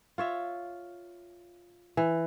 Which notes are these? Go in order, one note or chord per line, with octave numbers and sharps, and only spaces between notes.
F4 C#5 E5
E3